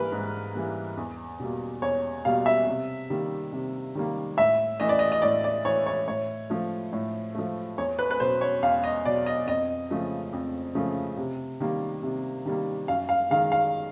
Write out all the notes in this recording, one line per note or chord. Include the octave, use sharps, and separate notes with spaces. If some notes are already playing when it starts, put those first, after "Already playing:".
Already playing: G#2 E3 G3 A#3 A#4 B4
G#2
E3 G3 A#3
E2
B2 G3 A#3
E2 C#5
B2 G3 A#3 F5
E5
C3
D#3 G3 A#3
C3
D#3 G3 A#3
A2 E5
E3 A3 D#5
D5
D#5
D#5
A2 D5
D5
E3 A3 C#5
C#5
A2 C#5
F3 A3
A2
F3 A3
E2 C#5
B4
B4
B2 F#3 C5
C#5
E2 F5
D#5
B2 F#3 D5
D#5
F2 D#5
C#3 F3 A3
F2
C#3 F3 A3
C3
D#3 G3 A#3
C3
D#3 G3 A#3
F#2 F5
F5
D#3 G#3 F5
F5